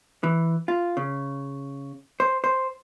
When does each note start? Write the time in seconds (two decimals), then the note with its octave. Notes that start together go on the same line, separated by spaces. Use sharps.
0.23 E3
0.68 F4
0.97 C#3
2.20 C5
2.44 C5